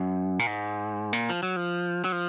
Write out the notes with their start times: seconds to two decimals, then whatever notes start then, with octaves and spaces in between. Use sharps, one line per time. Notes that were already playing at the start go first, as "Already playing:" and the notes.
Already playing: F#2
0.39 A#2
0.47 G#2
1.13 A#2
1.30 F3
1.43 F#3
1.56 F3
2.04 F#3
2.12 F3